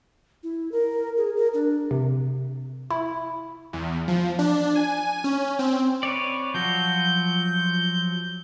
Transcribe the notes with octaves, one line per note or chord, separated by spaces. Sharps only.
E4
A#4
G#4
A#4
D4
C3
E4
E2
F3
D4
G#5
C#4
C4
B4 C#5 D5
F3 F#3 F#4 G6